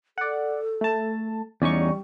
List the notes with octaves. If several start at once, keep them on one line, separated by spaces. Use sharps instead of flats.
A4 D5 F#5
A3 A5
E2 G3 C#4 D#4 D5 C#6